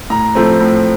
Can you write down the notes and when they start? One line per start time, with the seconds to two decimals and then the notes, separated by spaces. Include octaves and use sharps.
0.10 A2 A#5
0.35 F3 A3 C4
0.61 A2